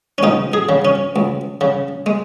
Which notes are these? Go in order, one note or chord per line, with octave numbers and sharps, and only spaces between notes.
C#4
C#2 D#4
G#4
C#3
C#4
C#2
C#3
G#3